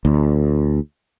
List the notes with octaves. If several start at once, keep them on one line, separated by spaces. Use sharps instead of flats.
D2